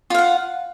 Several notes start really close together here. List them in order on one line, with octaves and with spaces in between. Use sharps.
F4 F5 F#5